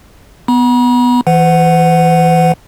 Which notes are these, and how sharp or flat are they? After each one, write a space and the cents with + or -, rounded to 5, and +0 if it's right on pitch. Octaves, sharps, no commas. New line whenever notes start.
B3 +5 B5 -45
E3 +0 C5 -45 F#5 +0